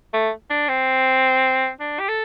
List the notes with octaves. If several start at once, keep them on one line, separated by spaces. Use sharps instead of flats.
A3
D4
C4
D4
G4
A4